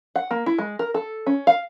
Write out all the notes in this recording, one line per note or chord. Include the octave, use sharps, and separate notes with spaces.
F#5
A#3
E4
G#3
A#4
A4
C#4
F5